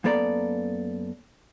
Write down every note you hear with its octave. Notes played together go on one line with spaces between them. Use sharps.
F#2 A#3 B3 A4 D5 A#5